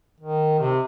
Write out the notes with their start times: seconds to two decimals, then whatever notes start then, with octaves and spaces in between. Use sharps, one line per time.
0.20 D#3
0.59 C3